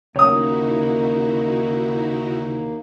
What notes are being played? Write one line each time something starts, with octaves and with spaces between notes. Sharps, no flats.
D#2 C#3 A#3 D#4 E4 F#4 C#5 D#6